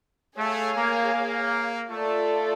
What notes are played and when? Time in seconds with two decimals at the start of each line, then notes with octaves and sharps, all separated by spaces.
0.36 A3 G#4 C#5 F5 G#5
0.75 A#3
1.13 A#3
1.90 A3 F4 A4 D5